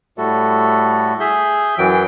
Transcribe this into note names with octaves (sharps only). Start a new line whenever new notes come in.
A2 G3 A3 F#4 A4
G#4 E5 G6
F#2 E3 F#3 G5